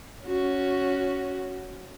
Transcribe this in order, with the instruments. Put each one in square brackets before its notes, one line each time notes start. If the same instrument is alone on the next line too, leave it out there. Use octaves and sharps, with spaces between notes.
[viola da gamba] C#4 F#4